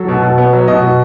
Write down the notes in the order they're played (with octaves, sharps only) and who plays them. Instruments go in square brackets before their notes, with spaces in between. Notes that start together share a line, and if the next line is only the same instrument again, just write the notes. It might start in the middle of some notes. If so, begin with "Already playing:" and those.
Already playing: [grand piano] F#3 A4
B2
B2
B3
F#3
B2 D#5
B2